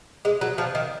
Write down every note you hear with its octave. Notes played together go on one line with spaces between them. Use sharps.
G#3
F#3
F3
D#3